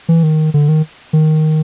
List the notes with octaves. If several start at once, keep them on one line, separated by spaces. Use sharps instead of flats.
E3
D#3
D3
D#3
D#3